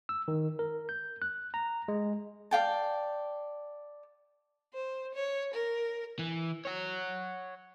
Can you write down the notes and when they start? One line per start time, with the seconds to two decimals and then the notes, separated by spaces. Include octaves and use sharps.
0.09 E6
0.28 D#3
0.59 A#4
0.89 G6
1.22 F#6
1.54 A#5
1.88 G#3
2.51 D5 F5 G5 A5
4.74 C5
5.14 C#5
5.53 A#4
6.19 E3
6.65 C#5 F#5